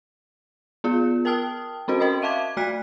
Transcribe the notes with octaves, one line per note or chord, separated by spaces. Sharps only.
B3 F4 G#4
A#4 G5 A5 D#6 F6
C4 C#4 F#4 C5
A#4 D#5 B5 D#6
E5 F5 A5 D6 G#6
A3 D5 F6 F#6 B6